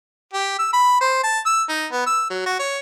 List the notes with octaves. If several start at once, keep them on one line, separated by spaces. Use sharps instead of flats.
G4
E6
B5
C5
A5
E6
D#4
B3
E6
F#3
F#4
C#5